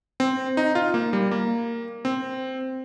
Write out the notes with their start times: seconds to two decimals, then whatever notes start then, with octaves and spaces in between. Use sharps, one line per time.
0.20 C4
0.57 D#4
0.75 F4
0.94 A#3
1.13 G3
1.31 A#3
2.05 C4